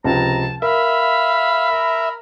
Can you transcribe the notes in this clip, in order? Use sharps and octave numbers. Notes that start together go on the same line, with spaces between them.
C#2 C3 F3 A5 A#5
A#4 E5 F5 B5
A#4